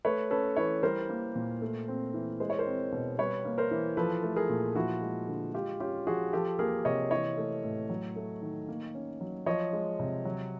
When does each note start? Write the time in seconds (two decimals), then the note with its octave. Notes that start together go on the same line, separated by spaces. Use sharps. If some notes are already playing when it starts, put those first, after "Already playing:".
0.05 A3 B4 C#5
0.31 C#4 A4 B4
0.57 E3 B4 C#5
0.83 G3 A#4 C5
1.10 A#3
1.35 A#2
1.62 A3
1.88 C4
2.14 E3
2.40 G#3 C5
2.50 C#5
2.59 A#4 C5
2.67 C4
2.92 B2
3.19 G3 B4 C#5
3.45 A#3
3.58 A#4 C5
3.71 E3
3.97 F3 A4 B4
4.23 A3
4.36 G#4 A#4
4.49 A#2
4.75 F3 E4 F#4
5.02 G#3
5.28 D3
5.54 G#3 F4 G4
5.80 C#4 F4 G4
6.06 F3 F#4 G#4
6.33 F3 G4 A4
6.59 A#3 G#4 A#4
6.85 C3 C#5 D#5
7.11 E3 C#5 D#5
7.37 A3
7.64 A2
7.90 F#3
8.16 A3
8.42 D#3
8.68 A#3
8.95 C#4
9.21 F#3
9.46 F3 C#5 D#5
9.73 G#3
9.99 C3
10.25 F#3